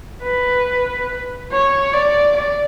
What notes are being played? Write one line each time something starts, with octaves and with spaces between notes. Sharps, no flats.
B4
C#5
D5
D5